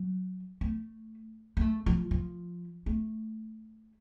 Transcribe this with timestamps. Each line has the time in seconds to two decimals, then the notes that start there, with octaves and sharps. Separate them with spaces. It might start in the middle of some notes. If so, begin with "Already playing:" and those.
Already playing: F#3
0.61 A3
1.57 A#3
1.61 A3
1.86 F3
2.11 F3
2.86 A3